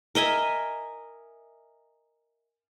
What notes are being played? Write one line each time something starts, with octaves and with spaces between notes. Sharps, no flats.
A#4 D#5 E5 G#5